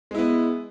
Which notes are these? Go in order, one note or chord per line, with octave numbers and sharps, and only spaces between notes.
G#3 B3 E4